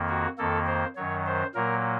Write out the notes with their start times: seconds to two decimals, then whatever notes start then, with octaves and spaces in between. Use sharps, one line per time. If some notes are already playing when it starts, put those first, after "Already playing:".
Already playing: F2 D#3 A#3
0.09 F#4
0.38 F2 D#3 A#3 A4
0.67 C5
0.96 F#2 D#3 F#3 C#5
1.26 C5
1.54 A#2 F#3 A#3 A#4